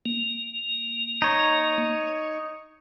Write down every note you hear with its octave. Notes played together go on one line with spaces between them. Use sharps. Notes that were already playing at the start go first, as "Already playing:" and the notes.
A#3
D#4 C#5